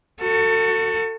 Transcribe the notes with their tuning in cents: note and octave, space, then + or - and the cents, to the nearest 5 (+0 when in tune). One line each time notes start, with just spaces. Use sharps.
F#4 +0 A4 +30